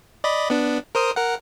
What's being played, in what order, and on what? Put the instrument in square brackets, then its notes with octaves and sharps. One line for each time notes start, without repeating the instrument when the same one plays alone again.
[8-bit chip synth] D5 D#5 B5
B3 D4
A#4 C5 D#6
A#4 F#5